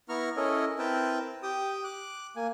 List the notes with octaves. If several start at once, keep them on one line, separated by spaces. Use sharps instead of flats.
B3 E4 A#5 C#6 F6
C#4 E4 A4 A#4 C#5 D#5
C4 E4 A#4 B4 G5 A5
G4 G5 D#6
D6 F#6
A#3 G#5